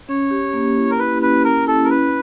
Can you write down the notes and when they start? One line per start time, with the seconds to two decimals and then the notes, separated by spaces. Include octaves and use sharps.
0.09 C#4 C#5
0.31 G4
0.53 A#3
0.77 E4
0.91 A#4
0.99 E4 B4
1.22 C#4 B4
1.44 C#4 A#4
1.67 E4 A4
1.84 A#4
1.90 C#4 B4